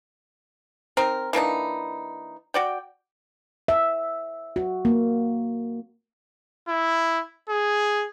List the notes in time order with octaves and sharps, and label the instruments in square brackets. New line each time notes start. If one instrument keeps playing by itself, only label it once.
[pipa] C4 D#4 A#4
E3 A#3 D4 D#4
F#4 D5 G5
[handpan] E5
F#4
A#3
[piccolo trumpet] E4
G#4